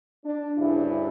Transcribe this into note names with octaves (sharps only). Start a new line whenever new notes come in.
D4
D2 G2 C#3 E4